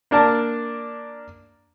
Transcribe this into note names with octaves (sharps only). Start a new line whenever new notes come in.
A#3 D4 A#4 A5